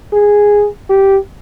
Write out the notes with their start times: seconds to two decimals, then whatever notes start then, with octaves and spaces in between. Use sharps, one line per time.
0.13 G#4
0.90 G4